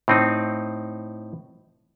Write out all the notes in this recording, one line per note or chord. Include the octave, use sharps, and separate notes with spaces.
A2 C4 D#4